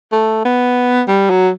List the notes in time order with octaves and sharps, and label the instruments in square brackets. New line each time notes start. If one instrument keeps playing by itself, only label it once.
[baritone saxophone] A3
B3
G3
F#3